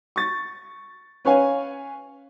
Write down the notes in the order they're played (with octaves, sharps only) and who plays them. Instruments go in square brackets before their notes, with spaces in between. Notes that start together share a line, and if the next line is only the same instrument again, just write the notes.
[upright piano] C#6 A6
C#4 B4 C#5 F5 G#5